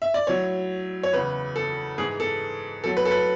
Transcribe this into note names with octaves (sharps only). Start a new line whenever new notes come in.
E5
D5
A2 F#3 C#5
C#5
E2 C#3 E3 B4
A4
G#2 E3 G#4
A4
A2 F#3 A4
B4
A4
B4